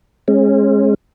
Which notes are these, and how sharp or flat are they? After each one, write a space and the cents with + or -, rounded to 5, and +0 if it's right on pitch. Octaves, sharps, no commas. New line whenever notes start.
G#3 +5 C#4 -30